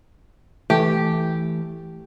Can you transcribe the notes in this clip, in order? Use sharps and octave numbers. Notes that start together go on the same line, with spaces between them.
E3 A3 G4